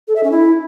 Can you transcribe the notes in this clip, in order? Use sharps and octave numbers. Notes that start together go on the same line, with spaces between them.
A4
E5
C#4
E4